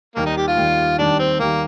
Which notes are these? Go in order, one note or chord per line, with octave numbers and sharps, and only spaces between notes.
D#2 D#3 G3 A#3
D#4
G4
F4
D#2 D#3 G3
D#2 D#3 G3 D4
C4
D#2 D#3 G3 A#3